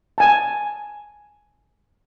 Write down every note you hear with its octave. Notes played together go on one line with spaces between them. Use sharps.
G#5 A5